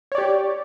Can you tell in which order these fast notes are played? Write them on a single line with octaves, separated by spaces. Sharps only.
C#5 D5 G4